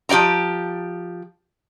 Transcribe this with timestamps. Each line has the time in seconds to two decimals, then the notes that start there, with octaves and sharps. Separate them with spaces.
0.09 F3 G4 D5 G5 A#5